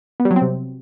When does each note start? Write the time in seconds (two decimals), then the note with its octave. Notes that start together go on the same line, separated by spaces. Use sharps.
0.20 B3
0.25 G3
0.31 F#3
0.36 C4
0.42 C3